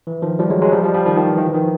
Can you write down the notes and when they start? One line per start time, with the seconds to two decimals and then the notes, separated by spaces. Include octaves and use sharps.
0.07 E3
0.22 D#3 F3
0.39 F3 G3
0.50 F#3 G#3
0.62 F#3 G#3
0.72 F3 G3
0.84 F3 G3
0.94 F3 G3
1.06 D#3 F3
1.16 D#3 F3
1.27 E3
1.38 D#3
1.47 E3
1.54 D#3 F3